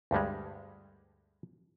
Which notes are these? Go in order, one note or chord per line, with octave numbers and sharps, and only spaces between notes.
D2 G2 G3 G#3